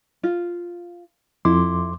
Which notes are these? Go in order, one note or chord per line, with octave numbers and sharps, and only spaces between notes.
F4
F2 E4 C6 D6